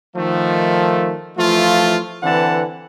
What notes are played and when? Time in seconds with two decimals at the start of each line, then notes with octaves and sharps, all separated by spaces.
0.16 D#3 F3 A3
1.37 E3 F3 A3 F4
2.23 D3 E3 C4 B4 F#5 A5